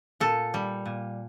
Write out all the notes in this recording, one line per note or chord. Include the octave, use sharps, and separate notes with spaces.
A#2 A4
G3
A#2